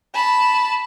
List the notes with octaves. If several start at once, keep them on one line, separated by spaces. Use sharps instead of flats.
A5 B5